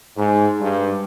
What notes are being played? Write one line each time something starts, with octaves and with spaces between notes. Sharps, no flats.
G#2
G2